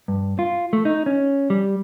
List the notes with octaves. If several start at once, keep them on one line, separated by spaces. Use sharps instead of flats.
G2
F4
A3
D#4
C#4
G3